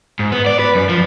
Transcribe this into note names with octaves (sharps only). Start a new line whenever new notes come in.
G#2
B3
D5
B4
F#2
F3